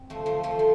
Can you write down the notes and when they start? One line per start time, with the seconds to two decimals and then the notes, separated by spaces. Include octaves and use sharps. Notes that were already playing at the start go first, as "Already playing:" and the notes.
Already playing: C4
0.10 F3 A3
0.26 F3 A3
0.43 F3 A3
0.59 F3